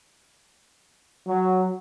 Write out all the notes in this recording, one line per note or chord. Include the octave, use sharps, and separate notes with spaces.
F#3